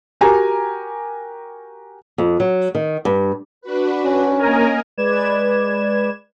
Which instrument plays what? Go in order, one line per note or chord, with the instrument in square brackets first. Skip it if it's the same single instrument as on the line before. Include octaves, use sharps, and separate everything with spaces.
[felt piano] F#4 G4 A#4 G#5 A#5
[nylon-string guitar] F2
F#3
D#3
G2
[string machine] D4 F#4 B4
[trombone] C#4
[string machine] A#3 D#5 [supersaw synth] A#4 G#5 A#5
[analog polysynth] G#3 B4 D5 G#6 E7